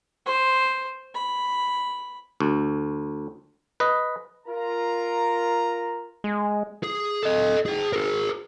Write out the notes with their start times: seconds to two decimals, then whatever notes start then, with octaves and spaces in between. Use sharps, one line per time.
0.26 C5
1.14 B5
2.40 D2
3.80 B4 D#5
4.47 F4 A#4 A#5
6.24 G#3
6.84 G#4
7.23 A4 D#5
7.66 G#4 G5
7.93 G#4 A#4